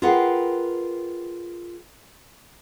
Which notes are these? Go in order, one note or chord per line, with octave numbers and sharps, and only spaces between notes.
F4 G#4 A#4 B4 F#5 G5